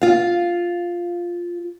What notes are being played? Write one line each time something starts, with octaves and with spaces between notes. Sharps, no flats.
F4 F5